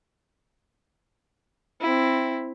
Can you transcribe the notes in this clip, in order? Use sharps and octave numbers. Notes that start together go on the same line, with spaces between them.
C4 E4